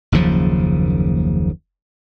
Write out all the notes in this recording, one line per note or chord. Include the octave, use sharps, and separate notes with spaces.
F#1 D#2 C#3 F3